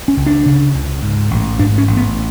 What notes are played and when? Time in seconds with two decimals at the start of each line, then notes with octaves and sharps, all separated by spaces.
0.08 C#4
0.17 C#2
0.26 D4
0.46 C#3
0.74 C#2
1.02 G#2
1.31 A1
1.59 G#2 D4
1.78 C#4
1.87 A1
1.97 B3